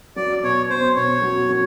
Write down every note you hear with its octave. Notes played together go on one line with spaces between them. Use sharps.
F#3 D5
B2 C#5
B2 C5
B2 C#5
F#3
F#3